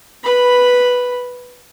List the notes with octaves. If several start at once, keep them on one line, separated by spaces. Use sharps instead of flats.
B4 B5